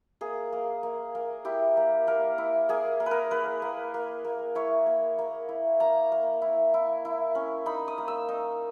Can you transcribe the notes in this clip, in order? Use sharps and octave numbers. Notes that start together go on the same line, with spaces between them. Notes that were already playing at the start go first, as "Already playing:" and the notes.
A#3 G#4
A#3
A#3
A#3
E4 G4
A#3
A#3 A#4
E4
A#3 G#4
A#3
B4
A#4
A#3 B4
A#3
A#3
A#3
E4 C#5
A#3
A#3
E4
A#3 A#5
A#3
E4
E4
E4
C#4
D#4 B5
D#6
A#3
E6
D#4